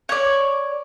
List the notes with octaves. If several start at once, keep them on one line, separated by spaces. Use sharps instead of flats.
C#5 D5